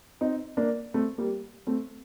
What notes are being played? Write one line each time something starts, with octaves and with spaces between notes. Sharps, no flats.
C4 D#4
A#3 D4
A3 C4
G3 A#3
A3 C4